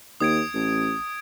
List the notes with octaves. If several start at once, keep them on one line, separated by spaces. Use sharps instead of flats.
D#2 D#6 G#6 D7
A1